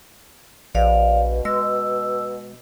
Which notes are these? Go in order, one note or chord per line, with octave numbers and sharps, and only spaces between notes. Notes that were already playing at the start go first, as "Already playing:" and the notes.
A#1 B2 D5 F5
G#3 E6